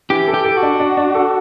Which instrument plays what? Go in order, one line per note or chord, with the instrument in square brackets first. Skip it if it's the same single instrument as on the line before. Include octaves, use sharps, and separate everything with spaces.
[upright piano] E3 [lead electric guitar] G4
[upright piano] A4
[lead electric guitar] G4
[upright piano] A4
[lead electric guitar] F#4
[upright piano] D4
D4
D4
A4